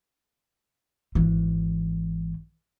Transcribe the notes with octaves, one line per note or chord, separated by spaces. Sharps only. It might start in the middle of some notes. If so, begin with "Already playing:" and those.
G#1 E3